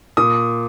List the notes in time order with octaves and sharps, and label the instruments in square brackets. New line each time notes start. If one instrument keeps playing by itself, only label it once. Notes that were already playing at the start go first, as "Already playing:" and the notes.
[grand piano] A#2 D#6